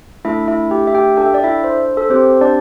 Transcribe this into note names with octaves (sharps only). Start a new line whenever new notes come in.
A3 D4 E4 A4 E5
E4 E5
G4 G5
E5
G4 G5
D4 A4 G5
E5
D5
E4 E5
C5
A4
C4 G4 C5
D4 D5